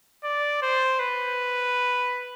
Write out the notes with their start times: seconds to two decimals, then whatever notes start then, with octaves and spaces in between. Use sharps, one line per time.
0.24 D5
0.62 C5
0.99 B4